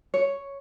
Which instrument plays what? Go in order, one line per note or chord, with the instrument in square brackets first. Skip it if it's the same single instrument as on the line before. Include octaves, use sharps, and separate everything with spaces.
[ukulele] C#5